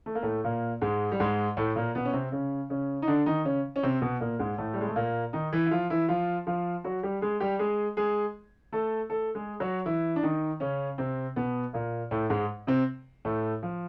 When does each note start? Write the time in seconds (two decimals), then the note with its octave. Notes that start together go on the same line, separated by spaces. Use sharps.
0.06 A3
0.15 A#3
0.23 A2 A3
0.44 A#2 A#3
0.81 G#2 G#3
1.12 G3
1.20 G#2 G#3
1.57 A2 A3
1.76 A#2 A#3
1.95 B2 B3
2.05 C#4
2.13 C3 C4
2.32 C#3 C#4
2.70 C#3 C#4
3.02 D#4
3.07 D3 D4
3.26 D#3 D#4
3.45 C#3 C#4
3.76 C#4
3.83 C3 C4
4.01 B2 B3
4.20 A#2 A#3
4.39 G#2 G#3
4.58 A2 A3
4.74 G3
4.81 G#3
4.88 A3
4.96 A#2 A#3
5.33 D#3 D#4
5.53 E3 E4
5.66 E4
5.71 F3 F4
5.90 E3 E4
6.08 F3 F4
6.47 F3 F4
6.84 F#3 F#4
7.03 G3 G4
7.21 G#3 G#4
7.40 G3 G4
7.59 G#3 G#4
7.97 G#3 G#4
8.72 A3 A4
9.10 A3 A4
9.35 G#3 G#4
9.60 F#3 F#4
9.86 E3 E4
10.16 D4
10.23 D#3 D#4
10.60 C#3 C#4
10.98 C3 C4
11.36 B2 B3
11.73 A#2 A#3
12.11 A2 A3
12.30 G#2 G#3
12.67 C3 C4
13.25 A2 A3
13.63 F3